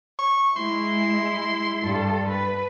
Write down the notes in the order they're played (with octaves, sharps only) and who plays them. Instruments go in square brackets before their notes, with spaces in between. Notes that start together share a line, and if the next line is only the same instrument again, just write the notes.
[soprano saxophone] C#6
[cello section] G#3 E4 [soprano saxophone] C6
[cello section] G2 A4
B4